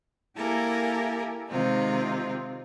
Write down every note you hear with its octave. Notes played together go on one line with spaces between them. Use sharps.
A#3 E4 G4 A4 A#4 G#5
C3 D#3 G#3 C4 D#4 F4